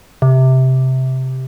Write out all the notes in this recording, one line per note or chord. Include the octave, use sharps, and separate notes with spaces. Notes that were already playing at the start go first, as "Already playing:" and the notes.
C3